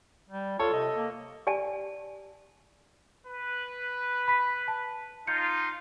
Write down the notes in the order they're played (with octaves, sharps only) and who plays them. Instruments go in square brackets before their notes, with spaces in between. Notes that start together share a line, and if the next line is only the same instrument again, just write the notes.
[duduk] G3
[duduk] F4 [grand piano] A4 [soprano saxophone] C#5
[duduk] C3 [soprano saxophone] D#5
[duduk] A#3
[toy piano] G4 D5 G#5 A5
[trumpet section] B4
[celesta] B5 B6
A5
[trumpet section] D#4 F4 [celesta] G6 C#7